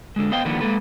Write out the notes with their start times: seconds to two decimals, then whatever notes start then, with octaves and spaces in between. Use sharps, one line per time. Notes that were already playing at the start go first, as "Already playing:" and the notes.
0.16 D3 G#3
0.31 B3 C5 D#5 F5 G5
0.45 D3 D#3 F3 G3 A#3 B3
0.61 G#3 A#3 A4 B4